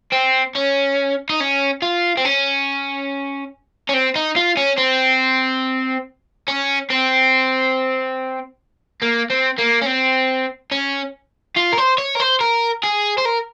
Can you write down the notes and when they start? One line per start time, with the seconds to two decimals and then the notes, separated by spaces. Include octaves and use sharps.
0.13 C4
0.55 C#4
1.30 D#4
1.40 C#4
1.82 F4
2.17 C4
2.25 C#4
3.89 C#4
3.94 C4
4.16 D#4
4.36 F4
4.57 C#4
4.78 C4
6.48 C#4
6.91 C4
9.02 A#3
9.30 C4
9.59 A#3
9.82 C#4
9.87 C4
10.71 C#4
11.56 F4
11.72 A#4
11.77 C5
11.98 C#5
12.15 A#4
12.20 C5
12.40 A#4
12.83 G#4
13.18 C5
13.25 A#4